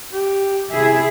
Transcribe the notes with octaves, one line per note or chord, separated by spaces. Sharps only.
G4
C3 E4 G#4 E5